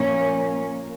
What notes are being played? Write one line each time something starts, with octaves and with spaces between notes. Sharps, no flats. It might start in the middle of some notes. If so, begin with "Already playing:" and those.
Already playing: A#2 F3 A#3 C#4